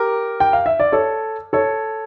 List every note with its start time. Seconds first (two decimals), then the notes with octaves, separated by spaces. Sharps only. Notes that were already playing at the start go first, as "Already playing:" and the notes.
Already playing: G4 A#4
0.40 G5
0.53 F5
0.66 E5
0.80 D5
0.92 A4 C#5
1.53 A4 C#5